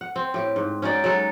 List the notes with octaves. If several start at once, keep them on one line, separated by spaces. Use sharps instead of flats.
F#5
C4
A2 G4
G#2
C#4 D#4 F#4 D5
F#3 G#3 A4